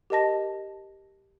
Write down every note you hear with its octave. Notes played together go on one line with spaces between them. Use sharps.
G4 A#4 D#5 A5 A#6